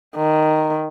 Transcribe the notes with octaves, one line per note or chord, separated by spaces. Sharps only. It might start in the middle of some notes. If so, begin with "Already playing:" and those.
D#3